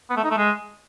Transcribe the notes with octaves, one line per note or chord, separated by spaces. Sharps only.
B3
A3
D#4
A3
G#3